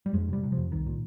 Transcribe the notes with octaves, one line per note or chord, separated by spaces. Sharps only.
G3
F2 G#3
C3 G3
C3
F3
F2
C2 D#3
A#2